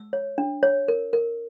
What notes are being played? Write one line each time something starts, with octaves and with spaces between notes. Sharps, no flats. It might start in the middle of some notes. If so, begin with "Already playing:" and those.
Already playing: E6
C#5
D4
C#5
A#4
A#4